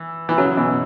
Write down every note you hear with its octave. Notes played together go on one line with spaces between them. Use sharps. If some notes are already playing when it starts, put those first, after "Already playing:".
Already playing: E3
E3
C#3 F#3
B2 E3